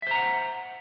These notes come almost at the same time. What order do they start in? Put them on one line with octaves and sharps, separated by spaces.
E5 C5 A#5 F#5